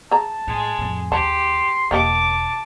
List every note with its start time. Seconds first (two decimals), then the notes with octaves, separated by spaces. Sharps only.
0.11 G#4 A5 A#5
0.47 A2 G#3
0.79 F2 A2
1.12 D#2 G4 A5 C6
1.91 E1 D3 A#3 G4 D#5 A5 D6